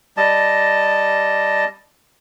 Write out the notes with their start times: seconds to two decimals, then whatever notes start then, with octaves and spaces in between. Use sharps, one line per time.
0.17 G3 D#5 A5